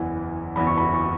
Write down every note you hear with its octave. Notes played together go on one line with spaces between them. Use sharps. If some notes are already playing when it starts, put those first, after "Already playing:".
Already playing: F#1 E2 E3 B3 E4 G#5
F#1 E2 E3 B3 E4 B5
C#6
B5
C#6